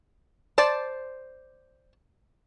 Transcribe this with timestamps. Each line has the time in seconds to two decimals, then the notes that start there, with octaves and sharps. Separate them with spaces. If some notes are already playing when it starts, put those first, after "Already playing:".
0.58 C5 D5 A5